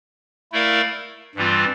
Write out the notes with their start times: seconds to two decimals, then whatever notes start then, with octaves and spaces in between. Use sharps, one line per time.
0.52 A3 E4 A#4 D5 F5
1.35 G2 E3 G3 C4 F4